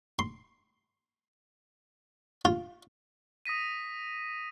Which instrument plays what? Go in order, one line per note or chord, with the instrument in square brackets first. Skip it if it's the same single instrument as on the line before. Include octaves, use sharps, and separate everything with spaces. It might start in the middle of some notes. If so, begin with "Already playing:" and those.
[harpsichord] C6
F4
[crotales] D#6 A#6 B6 D#7